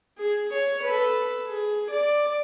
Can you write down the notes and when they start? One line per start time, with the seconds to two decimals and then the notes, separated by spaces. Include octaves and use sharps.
0.18 G#4
0.53 C#5
0.83 A4 B4
1.48 G#4
1.91 D5